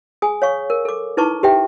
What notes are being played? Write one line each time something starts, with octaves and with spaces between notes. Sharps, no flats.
G#4 G#5 D#6
C#5 F5 C#6
A#4
A4 D6
D#4 E4 B4 A5 C#6 D6
G4 B4 E5 G5